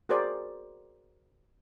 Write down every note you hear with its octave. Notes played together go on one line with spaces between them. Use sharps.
F#4 G#4 A#4 C5 D5